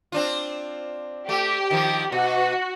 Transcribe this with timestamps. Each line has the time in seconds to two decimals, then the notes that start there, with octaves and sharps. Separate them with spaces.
0.12 C4 D4 F4
1.29 A3 G4
1.71 D#3 F3
2.12 B2 F#4